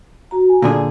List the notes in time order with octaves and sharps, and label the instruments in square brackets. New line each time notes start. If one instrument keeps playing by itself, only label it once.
[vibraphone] F#4 A#5
G#5
[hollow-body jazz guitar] A#2 D3 G#4